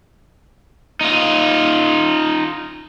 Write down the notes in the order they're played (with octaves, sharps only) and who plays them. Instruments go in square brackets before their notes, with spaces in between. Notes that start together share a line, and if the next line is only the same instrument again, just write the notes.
[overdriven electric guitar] D#4 F4